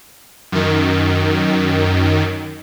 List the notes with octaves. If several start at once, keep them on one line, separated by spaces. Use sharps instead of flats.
F#2 D#3